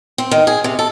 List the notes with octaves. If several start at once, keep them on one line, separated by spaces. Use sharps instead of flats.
C4
D#3
G#4
C3
A4